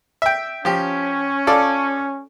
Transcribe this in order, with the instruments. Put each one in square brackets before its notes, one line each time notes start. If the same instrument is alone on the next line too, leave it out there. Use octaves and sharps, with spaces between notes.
[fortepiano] E5 G5
[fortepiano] F3 G4 [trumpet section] C#4
[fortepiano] F4 A4 D5